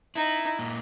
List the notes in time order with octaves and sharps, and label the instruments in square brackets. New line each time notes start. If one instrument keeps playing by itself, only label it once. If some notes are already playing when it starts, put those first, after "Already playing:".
[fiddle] D#4 [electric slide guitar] E4
[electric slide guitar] A#2